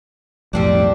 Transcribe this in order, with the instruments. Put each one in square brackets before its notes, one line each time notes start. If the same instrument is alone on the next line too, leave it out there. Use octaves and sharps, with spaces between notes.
[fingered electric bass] B1 F2 A2 [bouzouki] G3 C4 D4